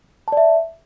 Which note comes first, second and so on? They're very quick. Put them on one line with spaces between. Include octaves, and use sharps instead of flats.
A5 D5 E5